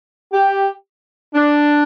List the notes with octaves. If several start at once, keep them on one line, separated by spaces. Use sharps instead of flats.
G4
D4